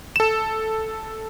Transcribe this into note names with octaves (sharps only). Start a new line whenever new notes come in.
A4 E7